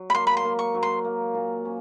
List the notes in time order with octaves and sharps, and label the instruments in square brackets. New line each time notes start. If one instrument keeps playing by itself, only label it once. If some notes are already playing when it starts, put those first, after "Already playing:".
Already playing: [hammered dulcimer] F#3
[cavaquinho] B5
[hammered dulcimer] A#3 [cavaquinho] C6
[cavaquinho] B5
C6
[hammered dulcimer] A#3
[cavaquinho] C#6
[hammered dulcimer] F#3
[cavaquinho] C6
[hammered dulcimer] A#3
A#2
C#4